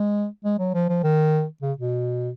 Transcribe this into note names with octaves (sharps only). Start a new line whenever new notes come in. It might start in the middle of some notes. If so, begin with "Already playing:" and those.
Already playing: G#3
G#3
F#3
F3
F3
D#3
C#3
B2